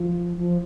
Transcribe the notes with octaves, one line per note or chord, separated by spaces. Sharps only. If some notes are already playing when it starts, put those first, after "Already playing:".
Already playing: F3
F3